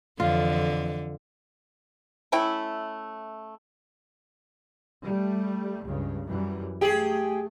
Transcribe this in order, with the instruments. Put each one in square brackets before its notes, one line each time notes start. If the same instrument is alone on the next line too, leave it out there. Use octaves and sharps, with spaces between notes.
[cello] F2 E3 [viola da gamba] D3 [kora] F4
[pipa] A3 C#4 E4 G5
[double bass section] G3 A3
C#2 G2 C#3
F#2 E3 G3
[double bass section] A3 [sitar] G4 G#4